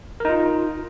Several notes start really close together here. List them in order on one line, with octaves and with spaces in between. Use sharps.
A#4 D#4 F4